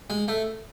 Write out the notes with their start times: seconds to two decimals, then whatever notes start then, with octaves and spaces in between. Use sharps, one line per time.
0.10 G#3
0.28 A3